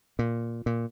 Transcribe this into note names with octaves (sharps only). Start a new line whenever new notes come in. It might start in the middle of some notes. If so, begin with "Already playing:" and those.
A#2
A#2